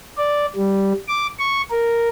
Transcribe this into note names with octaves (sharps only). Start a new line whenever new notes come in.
D5
G3
D6
C#6
A#4